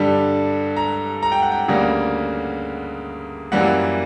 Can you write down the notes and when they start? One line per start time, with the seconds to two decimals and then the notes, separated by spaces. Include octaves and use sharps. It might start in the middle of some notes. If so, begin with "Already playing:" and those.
Already playing: G2 D3 G3
0.77 A#5
1.23 A#5
1.32 G5
1.42 F#5
1.51 G5
1.68 D2 C#3 G3 A#3 F#5
3.52 F#2 E3 G3 A#3 F#5